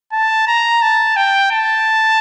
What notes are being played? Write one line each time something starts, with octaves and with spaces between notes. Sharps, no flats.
A5
A#5
A5
G5
A5